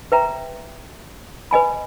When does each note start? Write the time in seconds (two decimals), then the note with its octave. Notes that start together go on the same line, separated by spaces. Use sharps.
0.12 B4 E5 G5 A#5
1.51 B4 D#5 G#5 B5